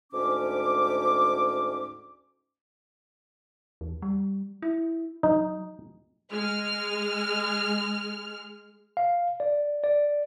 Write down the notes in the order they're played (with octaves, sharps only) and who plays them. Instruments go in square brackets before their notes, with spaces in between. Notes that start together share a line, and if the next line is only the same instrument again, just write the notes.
[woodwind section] D2 G#2 C#4 D6
[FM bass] E2
G3
E4
[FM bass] F#3 [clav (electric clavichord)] D#4
[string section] G#3 F6
[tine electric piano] F5
D5
D5